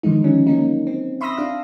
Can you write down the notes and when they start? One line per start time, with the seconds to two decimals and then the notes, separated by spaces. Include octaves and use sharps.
0.03 D3 D#3 F3 G#3 D#4
0.24 F3 F#3 C#4
0.47 A#3 C#4 D#4
0.87 C4
1.21 E5 B5 C6 D#6 E6 A#6
1.37 D4 F5